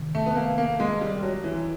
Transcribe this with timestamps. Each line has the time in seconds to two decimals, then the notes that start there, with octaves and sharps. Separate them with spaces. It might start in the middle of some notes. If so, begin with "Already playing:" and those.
Already playing: C3 D#3
0.15 A3
0.26 B3
0.36 A#3
0.58 A#3
0.80 G#3
1.01 G3
1.23 F#3
1.44 E3